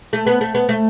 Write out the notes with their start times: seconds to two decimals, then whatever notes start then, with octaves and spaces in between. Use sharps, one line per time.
0.13 A3
0.26 B3
0.41 A3
0.55 B3
0.69 A3